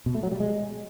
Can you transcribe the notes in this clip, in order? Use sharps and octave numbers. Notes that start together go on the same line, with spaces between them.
B2
A3
F#3
G3
G#3